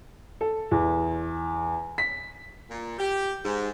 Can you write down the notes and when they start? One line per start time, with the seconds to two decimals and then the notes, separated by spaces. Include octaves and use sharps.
0.41 A4
0.71 E2
1.98 B6
2.70 A#2
2.99 G4
3.45 G#2